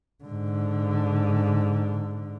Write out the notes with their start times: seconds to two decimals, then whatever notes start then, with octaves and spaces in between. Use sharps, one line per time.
0.24 G#2 D3